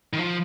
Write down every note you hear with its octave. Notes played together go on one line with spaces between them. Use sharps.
D#3
F3